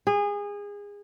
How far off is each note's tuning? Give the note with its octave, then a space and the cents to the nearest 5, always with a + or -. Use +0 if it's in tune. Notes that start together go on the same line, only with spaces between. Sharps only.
G#4 -25